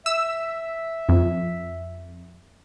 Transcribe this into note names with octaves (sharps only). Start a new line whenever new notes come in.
E5 E6
F2